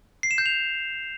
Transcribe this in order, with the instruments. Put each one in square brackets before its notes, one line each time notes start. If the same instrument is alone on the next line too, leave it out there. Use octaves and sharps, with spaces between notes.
[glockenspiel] C7
E7
G6
F7